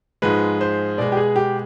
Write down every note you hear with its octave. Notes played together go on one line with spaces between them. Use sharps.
G#2 F3 G#3 B4
C5
B2 G#3 D5
G4
G#4
G4